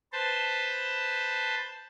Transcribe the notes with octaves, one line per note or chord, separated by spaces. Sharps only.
B4 C5 A5